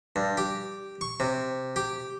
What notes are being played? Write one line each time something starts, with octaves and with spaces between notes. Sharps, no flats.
G2
G4
C#6
C3
G4